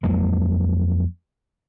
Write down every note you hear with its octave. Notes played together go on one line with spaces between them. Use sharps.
F2 F#3 G#3 A#3